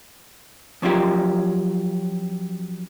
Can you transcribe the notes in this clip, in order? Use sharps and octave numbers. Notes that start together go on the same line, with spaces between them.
F3 F#3 C#4 F4 G4 A#4